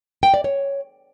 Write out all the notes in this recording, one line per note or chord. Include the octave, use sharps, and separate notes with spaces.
G5
D5
C#5